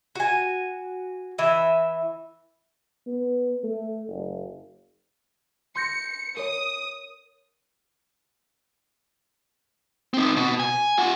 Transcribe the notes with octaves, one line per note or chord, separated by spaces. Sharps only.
F#4 G#5
E3 E5
B3
A3
F#1
C6 G6 A#6 C#7
A#4 C#5 D#6
C4 D#4
B2
G#5
F4 F#5